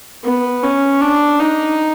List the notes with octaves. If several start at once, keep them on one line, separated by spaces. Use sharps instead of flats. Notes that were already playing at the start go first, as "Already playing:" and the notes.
B3
C#4
D4
D#4